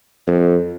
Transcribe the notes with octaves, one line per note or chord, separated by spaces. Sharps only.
F2